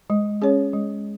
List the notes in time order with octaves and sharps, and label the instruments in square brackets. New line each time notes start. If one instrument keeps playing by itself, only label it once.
[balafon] G#3
C#4 G#4 C#5
G#3